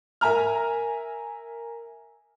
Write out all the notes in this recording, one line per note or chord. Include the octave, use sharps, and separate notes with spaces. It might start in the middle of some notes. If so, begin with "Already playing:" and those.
A#4 E5 G#5 A#5 F6